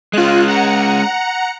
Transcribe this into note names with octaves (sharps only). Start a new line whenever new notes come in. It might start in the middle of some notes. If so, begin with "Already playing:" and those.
G#3 C#4 F4 F#6
F#5 A#5 C#7